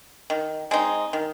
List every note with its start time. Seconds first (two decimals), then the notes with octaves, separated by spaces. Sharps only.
0.30 D#3
0.71 G#3 C4 D#4
1.13 D#3